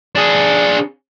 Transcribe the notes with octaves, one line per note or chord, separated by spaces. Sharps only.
D4 G#4